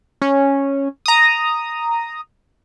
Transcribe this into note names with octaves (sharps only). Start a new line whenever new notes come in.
C#4
A#5 D#6